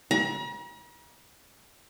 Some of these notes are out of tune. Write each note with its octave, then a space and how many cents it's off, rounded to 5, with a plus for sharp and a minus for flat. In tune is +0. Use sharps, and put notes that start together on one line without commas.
A#5 +45